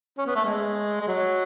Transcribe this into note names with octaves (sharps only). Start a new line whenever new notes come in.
C#4
B3
A3
G#3
G#3
F#3